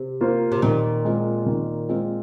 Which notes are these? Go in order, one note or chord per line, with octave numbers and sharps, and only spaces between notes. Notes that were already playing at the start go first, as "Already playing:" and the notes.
Already playing: C3
A#3 F4 C5
C3
A#2 D#3
G#3 C4 F4
D#3
G#3 C4 F4